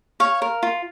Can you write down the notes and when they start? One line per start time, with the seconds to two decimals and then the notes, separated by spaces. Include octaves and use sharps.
0.20 C#5 F5
0.42 A#4
0.63 F4